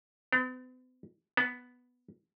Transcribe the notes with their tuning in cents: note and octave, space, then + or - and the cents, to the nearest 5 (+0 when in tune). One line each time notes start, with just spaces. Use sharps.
B3 +45
B3 +0